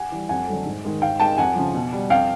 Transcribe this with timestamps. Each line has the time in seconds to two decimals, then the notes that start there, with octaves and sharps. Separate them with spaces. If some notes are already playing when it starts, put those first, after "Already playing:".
Already playing: F#5 G#5
0.12 E3 G3
0.29 F2 F#5 G#5
0.47 D3 F#3 A3
0.66 G#2
0.85 D#3 G#3
1.02 G#2 F5 G5
1.20 D#3 G#3 G5 A5
1.38 F2 F#5 G#5
1.56 C#3 F3
1.74 B2
1.93 G3
2.10 F2 F5 G5